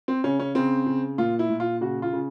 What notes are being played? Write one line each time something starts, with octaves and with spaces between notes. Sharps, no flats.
C4
C#3 C#4
C#4
C#3 C4
C#3
A#2 F4
E4
A#2
F4
C#3 F#4
F4
C#3